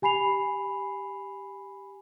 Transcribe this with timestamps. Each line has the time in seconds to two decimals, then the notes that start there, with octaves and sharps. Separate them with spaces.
0.02 G4 G#5 B5 C7 F7